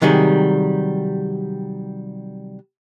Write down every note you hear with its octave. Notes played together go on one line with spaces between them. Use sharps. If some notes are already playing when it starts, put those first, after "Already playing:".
C3 D#3 F#3 G3 G#4